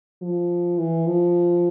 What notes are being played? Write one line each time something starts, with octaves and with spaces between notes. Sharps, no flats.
F3
E3
F3